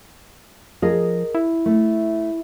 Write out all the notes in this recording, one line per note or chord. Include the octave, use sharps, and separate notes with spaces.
F3 G#4 A#4 D#5
E4
A3